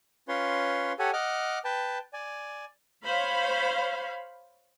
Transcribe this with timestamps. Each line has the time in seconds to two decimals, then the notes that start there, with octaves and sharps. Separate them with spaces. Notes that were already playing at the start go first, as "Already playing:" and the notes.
0.28 C#4 F4 B4 C#5 C6
0.99 G4 A4 C#5 F#5 G#5
1.13 D#5 F#5 D6 F6
1.65 B4 G5 A5
2.13 D5 G#5
3.05 C5 C#5 F5 B5